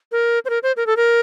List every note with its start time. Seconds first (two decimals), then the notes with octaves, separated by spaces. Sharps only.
0.12 A#4
0.45 C5
0.50 A#4
0.63 C5
0.77 A#4
0.87 A4
0.97 A#4